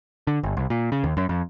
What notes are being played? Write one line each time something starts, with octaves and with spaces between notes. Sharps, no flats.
D3
G1
C2
A#2
C#3
D#2
F#2
F2